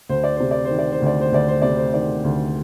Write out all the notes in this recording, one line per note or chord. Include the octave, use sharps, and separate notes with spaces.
D2 C5
D5
C3 C5
D5
C5
D#3
D5
C5
D2 D5
C5
D2 D5
C5
C3 D5
C5
D#3 D5
D2